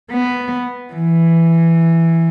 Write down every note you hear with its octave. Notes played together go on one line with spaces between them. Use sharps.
B3
E3